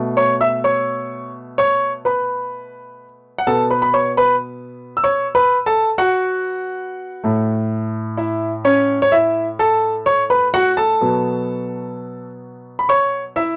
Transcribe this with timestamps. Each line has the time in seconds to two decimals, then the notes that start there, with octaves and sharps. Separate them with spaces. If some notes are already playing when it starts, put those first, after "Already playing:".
Already playing: B2 A3
0.17 C#5 C#6
0.41 E5 E6
0.64 C#5 C#6
1.58 C#5 C#6
2.05 B4 B5
3.38 F#5
3.47 B2 B3 A4 A5
3.70 B4 B5
3.82 B5
3.94 C#5 C#6
4.17 B4 B5
4.97 E6
5.04 C#5 C#6
5.35 B4 B5
5.66 A4 A5
5.98 F#4 F#5
7.24 A2 A3
8.17 E4 E5
8.65 C#4 C#5
9.02 C#5
9.12 E4 E5
9.59 A4 A5
10.06 C#5 C#6
10.30 B4 B5
10.54 F#4 F#5
10.77 A4 A5
11.01 B2 F#3 B3
12.79 B5
12.89 C#5 C#6
13.36 E4 E5